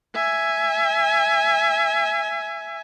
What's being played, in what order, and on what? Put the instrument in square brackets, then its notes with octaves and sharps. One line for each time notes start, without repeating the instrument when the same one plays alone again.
[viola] E5 G#5